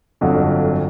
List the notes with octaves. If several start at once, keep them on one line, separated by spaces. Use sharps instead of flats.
G1 F2 D3 F#3